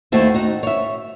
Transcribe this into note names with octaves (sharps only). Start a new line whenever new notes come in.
D#2 A3 C4 F#4 E5
D#4 F#4
C#5 E5